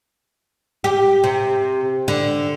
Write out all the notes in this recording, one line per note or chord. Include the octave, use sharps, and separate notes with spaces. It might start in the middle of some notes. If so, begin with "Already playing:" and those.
G4
C3
D3